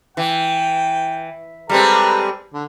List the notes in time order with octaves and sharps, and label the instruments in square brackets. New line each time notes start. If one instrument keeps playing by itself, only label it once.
[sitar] E3 [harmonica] G5
[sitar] G3 G#3 C4 [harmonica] A4 B4 A#5
[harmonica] D3